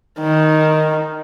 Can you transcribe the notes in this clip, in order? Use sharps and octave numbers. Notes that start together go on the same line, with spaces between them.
D#3